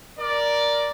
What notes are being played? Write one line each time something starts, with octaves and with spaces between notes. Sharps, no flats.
A#4 D5